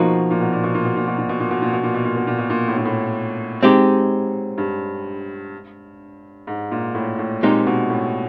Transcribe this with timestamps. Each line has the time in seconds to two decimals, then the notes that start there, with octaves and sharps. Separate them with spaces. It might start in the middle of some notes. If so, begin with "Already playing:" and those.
Already playing: B2 F3 A#3 D#4 F#4
0.31 A#2
0.41 B2
0.53 A#2
0.64 B2
0.75 A#2
0.85 B2
0.96 A#2
1.08 B2
1.18 A#2
1.29 B2
1.40 A#2
1.51 B2
1.62 A#2
1.73 B2
1.83 A#2
1.94 B2
2.05 A#2
2.16 B2
2.27 A#2
2.38 B2
2.50 A#2
2.68 A2
2.77 A#2
2.85 A2
3.62 G#3 C4 D#4 G4
4.58 G2
6.47 G#2
6.71 A#2
6.95 A2
7.19 A2
7.43 A#2 G#3 C4 D#4 G4 C5
7.67 B2
7.90 A2